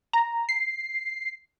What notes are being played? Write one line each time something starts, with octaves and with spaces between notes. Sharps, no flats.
A#5
C7